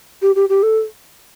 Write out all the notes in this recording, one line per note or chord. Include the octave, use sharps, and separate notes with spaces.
G4
G4
G4
A4